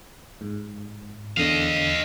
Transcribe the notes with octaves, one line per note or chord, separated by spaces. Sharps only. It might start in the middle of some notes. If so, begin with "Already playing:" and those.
G#2
E2 D3 D#5 F5